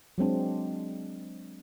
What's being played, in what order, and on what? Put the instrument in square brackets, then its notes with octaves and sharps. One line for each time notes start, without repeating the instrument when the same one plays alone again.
[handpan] F#3 G#3 C4 D4